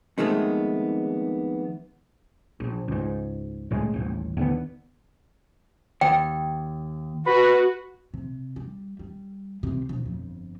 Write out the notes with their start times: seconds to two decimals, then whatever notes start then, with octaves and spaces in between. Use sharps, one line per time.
0.18 F2 D#3 G#3 A3 B3
2.60 A#1
2.88 C#2 G#2
3.71 C#2 A2 G#3
3.94 D#1 A1
4.37 D#2 D3 B3
6.01 D#2 G5
7.27 F#4 B4
8.14 C3
8.56 G3
8.99 G3
9.63 C2 C3
9.89 E1
10.06 G1 F2